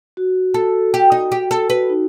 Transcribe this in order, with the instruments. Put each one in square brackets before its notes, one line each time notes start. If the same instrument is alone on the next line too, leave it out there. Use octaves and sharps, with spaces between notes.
[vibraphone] F#4
[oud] A4
G4
D#4
G4
A4
[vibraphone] F#4 [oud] B4
[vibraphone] D#4